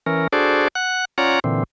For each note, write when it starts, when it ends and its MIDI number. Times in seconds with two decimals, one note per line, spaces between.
0.06 0.27 52
0.06 0.27 61
0.06 0.27 70
0.33 0.68 62
0.33 0.68 66
0.33 0.68 68
0.33 0.68 69
0.33 0.68 72
0.33 0.68 74
0.75 1.05 78
0.75 1.05 90
1.18 1.39 61
1.18 1.39 65
1.18 1.39 73
1.18 1.39 74
1.18 1.39 78
1.18 1.39 82
1.44 1.63 46
1.44 1.63 50
1.44 1.63 52
1.44 1.63 60